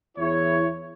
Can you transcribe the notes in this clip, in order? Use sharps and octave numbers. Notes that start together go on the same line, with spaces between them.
E2 E4 C#5